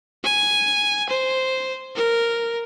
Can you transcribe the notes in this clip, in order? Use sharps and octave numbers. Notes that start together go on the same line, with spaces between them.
G#5
C5
A#4